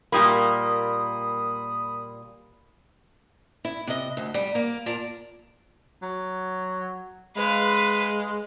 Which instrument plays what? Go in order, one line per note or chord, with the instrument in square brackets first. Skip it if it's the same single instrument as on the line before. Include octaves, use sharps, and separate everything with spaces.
[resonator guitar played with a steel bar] A#2 G3 A#3 [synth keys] B5 D#6
[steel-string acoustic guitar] E4
C3 D#5
D2
G3
A#3
A#2 A#4 A5
[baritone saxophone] F#3
[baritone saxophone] G#3 [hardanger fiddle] B4 F5